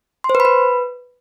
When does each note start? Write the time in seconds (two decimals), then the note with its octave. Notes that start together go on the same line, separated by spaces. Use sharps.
0.24 C6
0.30 C5
0.35 B4
0.40 B5
0.45 B4